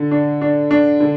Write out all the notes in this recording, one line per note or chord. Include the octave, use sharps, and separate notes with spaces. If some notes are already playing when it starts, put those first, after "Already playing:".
Already playing: D3
D4
D4
D4
D3